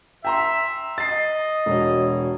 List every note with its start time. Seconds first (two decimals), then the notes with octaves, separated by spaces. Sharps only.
0.25 E5 G5 A#5 C6
0.98 D#5 A6 C7
1.66 E1 F#4 C#5